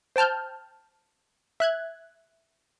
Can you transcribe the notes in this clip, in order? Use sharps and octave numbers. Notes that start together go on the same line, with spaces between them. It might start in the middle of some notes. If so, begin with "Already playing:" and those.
C5 G5 A5 F6 G6
E5 F#6 G#6